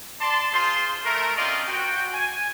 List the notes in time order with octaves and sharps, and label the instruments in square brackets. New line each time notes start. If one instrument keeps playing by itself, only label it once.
[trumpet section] D5 A5 C6
F4 G#4 C5 C6
A3 A#4
C4 C#4 F4 A#4 D5 D#5
F#4 G5
G#5